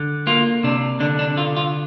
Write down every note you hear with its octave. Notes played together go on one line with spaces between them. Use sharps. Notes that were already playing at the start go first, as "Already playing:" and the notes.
Already playing: D3
A#3 F4
C3 D4
D3 D4
D4
D3 F4
F4